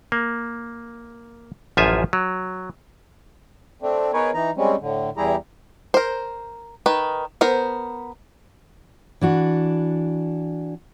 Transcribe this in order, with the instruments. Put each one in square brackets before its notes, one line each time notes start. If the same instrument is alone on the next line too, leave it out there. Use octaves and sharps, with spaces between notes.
[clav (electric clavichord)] A#3
A1 F#2 F3 F4 E5 G#5
F#3
[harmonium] A3 C4 D4
B3 D#4 G#4 A#4 B4 C#5
E3 D#4 A#5
G3 G#3 C4 C#4
A2 D3
E2 G3 E4 G4 G#4 A#5
[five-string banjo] A#4 C5
D#3 B4
B3 A#4 C5
[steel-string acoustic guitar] E3 D4 F#4